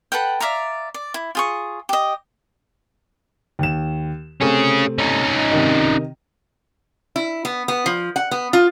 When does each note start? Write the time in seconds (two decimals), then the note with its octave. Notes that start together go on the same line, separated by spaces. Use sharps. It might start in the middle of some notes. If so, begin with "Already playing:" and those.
0.12 A4 B4 F#5 G5
0.40 D5 E5 F5 A#5
0.94 D5
1.14 E4
1.35 F4 G#4 C#6
1.89 G4 D#5
3.59 D#2 E7
4.41 C3 A3 C4 C#4 G#4
4.98 C#4 D#4
5.51 C3 D#3 D#5
7.16 E4
7.45 B3
7.68 B3
7.86 F3
8.16 F#5
8.31 B3
8.53 F4